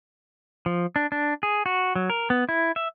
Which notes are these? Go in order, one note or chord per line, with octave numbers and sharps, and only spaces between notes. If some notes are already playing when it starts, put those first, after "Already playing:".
F3
D4
D4
G#4
F#4
F#3
A#4
B3
E4
E5